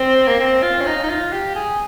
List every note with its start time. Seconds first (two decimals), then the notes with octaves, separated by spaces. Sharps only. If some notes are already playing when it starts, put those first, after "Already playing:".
Already playing: C4
0.28 A#3
0.40 C4
0.62 F4
0.80 C#4
0.86 D#4
1.03 D#4
1.09 F4
1.32 G4
1.55 G#4